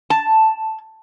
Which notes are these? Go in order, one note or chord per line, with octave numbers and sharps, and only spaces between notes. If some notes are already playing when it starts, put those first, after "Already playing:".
A5